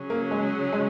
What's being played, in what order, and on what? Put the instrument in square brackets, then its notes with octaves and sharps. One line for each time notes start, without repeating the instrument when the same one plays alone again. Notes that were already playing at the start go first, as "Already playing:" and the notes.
Already playing: [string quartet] C#3 F#3 C#4 G#4
[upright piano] A#3
G#3
G#3